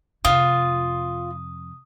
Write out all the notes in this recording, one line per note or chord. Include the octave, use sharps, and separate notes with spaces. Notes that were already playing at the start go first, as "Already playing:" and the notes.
F2 C3 F4 D#6